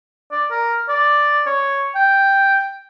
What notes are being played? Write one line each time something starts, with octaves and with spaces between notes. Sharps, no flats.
D5
A#4
D5
C#5
G5